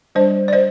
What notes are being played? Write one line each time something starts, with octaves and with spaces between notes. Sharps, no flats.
G3 D4 C5 D#5
D5
C5 D#5